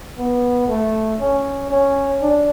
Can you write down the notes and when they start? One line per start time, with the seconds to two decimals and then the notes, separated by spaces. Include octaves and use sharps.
0.17 B3
0.68 A3
1.19 C#4
1.70 C#4
2.21 D4